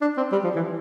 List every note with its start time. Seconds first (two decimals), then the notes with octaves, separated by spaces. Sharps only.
0.01 D4
0.17 C4
0.32 G3
0.44 F3
0.56 E3